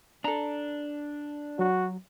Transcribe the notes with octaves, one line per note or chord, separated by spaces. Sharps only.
D4 A4 A#5
F#3 F#4